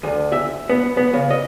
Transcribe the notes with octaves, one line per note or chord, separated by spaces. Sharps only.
D2
E5
B3
B3
C#3
D#5